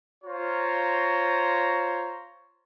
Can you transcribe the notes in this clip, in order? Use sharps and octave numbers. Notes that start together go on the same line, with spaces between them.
F4 C5 C#5 A#5